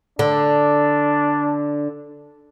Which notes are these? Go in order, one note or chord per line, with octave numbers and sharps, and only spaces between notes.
D3 D4